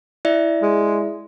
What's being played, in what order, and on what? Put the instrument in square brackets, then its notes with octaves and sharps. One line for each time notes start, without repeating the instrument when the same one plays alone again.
[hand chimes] E4 D5 E5
[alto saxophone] G#3